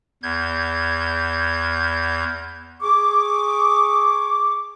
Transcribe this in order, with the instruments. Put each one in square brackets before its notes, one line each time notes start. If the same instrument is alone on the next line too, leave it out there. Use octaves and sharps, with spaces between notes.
[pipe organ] E2 G6 G#6
[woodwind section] G#4 C#6 D6